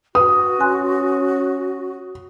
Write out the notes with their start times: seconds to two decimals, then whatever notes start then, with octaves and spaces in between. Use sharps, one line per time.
0.15 F#4 B4 D#6
0.60 C#4 G#5 C6 F#6